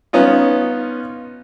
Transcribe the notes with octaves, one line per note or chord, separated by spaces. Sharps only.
B3 C#4 D#4 F4